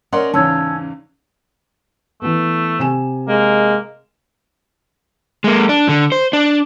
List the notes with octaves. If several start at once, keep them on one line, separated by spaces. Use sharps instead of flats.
C#4 A#4 D5 D#5 F#5 C6
E2 G#2 C#3 C#4 A5 E6 G#6
E3 A3 B3
C3 G#5 E7
G#3 A#3
G#3 A#3
D4
D3
C5
D4